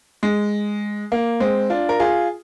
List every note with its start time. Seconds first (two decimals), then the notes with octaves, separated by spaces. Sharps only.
0.23 G#3
1.12 A#3
1.40 G#3 C4
1.70 D4 F4
1.89 A#4
2.00 F4 G#4